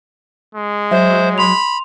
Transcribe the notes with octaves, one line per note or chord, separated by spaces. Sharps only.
G#3
F#3 C5 E5
B5 C6 F7